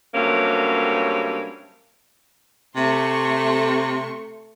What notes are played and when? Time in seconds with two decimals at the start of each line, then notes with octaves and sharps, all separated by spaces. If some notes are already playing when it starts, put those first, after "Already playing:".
0.15 G2 C3 F#3 A3 A#3 C#4
2.76 C3 A3 C6 C#6